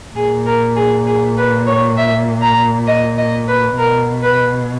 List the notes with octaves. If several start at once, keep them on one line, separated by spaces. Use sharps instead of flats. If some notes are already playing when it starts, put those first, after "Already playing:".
A#2 G#4
A#4
G#4
G#4
B4
C#5
E5
A#5
D#5
D#5
B4
B2 A#4
B4